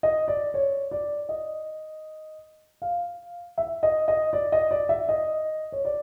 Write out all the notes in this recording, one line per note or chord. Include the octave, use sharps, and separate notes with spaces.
D#5
D5
C#5
D5
D#5
F5
E5
D#5
D#5
D5
D#5
D5
E5
D#5
C#5
D5